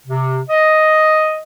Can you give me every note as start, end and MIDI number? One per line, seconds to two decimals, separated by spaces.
0.07 0.39 48
0.50 1.41 75